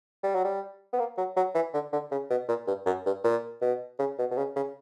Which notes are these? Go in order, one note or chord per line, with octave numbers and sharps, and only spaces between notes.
G3
F#3
G3
B3
A#3
F#3
F#3
E3
D3
D3
C#3
B2
A#2
G2
F#2
G2
A#2
B2
C#3
B2
B2
C#3
C#3